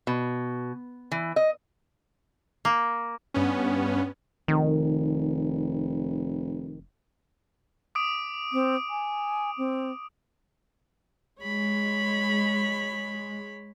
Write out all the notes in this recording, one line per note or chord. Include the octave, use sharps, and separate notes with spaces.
B2
E3
D#5
A#3
G2 B3 C#4
F1 D#3
D6 D#6 D7
C4
G#5
C4
G#3 C#5 B5